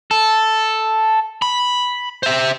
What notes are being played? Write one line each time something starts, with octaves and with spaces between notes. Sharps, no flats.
A4
B5
C5 E5